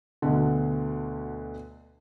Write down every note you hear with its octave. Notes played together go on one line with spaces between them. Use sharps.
D2 B2 D3